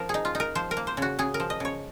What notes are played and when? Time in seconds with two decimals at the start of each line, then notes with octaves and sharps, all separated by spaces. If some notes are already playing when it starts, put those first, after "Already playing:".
Already playing: F3 A#4
0.09 D#4 G#4
0.25 F4
0.35 D#4
0.40 A#4
0.55 F3 C5
0.71 A#4
0.77 A#3
0.87 C5
0.97 C#3 F#4
1.19 C#3 G#4
1.34 A#4
1.40 F3
1.50 D#5
1.60 C#3 C#5